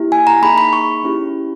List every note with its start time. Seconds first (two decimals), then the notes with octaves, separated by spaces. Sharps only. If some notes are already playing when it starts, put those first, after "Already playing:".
Already playing: A#3 E4 G4
0.12 G#5
0.27 A#5
0.42 A#3 D#4 G#4 B5
0.58 B5
0.73 C#6
1.04 C#4 E4 G4